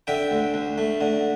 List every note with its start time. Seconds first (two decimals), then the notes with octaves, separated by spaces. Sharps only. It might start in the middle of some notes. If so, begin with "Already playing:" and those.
0.07 D3 E5 G5
0.31 D2
0.54 D2
0.78 A3
1.01 D3